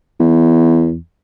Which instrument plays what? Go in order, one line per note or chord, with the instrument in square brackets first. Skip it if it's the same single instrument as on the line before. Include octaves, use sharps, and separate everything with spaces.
[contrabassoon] E2